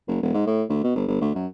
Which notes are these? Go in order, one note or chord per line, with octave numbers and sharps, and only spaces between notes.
F#1
E1
G#2
A2
D2
B2
G1
G1
D2
F#2